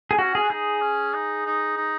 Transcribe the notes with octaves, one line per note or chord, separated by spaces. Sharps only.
G#4
C#4 F#4
G#4
F#4
D#4 G#4
C#4
D#4
D#4
D#4